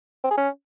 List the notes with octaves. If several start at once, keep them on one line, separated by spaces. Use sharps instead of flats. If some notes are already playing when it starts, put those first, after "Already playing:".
C4
G#4
C#4